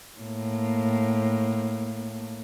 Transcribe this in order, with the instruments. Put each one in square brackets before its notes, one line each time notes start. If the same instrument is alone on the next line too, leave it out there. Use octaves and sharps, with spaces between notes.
[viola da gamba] A2 A#3